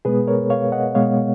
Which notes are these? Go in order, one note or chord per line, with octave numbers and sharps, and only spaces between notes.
B2 G#3 B3 G#4 B4
A#4 C#5
C#5 F5
D#5 F#5
B2 G#3 B3 C#5 F5